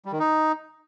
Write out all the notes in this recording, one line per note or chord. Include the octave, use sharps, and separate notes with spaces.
G3
D#3
D#4